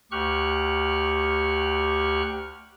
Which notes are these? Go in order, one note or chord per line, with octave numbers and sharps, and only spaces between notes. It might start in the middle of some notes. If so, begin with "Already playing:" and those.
D2 G4 C#6 F6 F#6